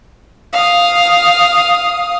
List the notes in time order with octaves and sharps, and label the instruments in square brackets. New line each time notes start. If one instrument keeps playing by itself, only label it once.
[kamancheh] F5 D#6